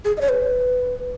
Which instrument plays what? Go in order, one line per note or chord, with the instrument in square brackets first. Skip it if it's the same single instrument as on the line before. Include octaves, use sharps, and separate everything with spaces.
[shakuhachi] G#4
D#5
C#5
B4